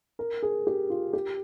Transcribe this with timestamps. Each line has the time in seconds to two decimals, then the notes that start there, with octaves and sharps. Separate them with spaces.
0.19 A#4
0.43 G#4
0.67 G4
0.90 F4
1.13 G4